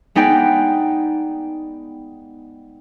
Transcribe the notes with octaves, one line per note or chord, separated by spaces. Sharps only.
G#3 B3 D#4 D5 G5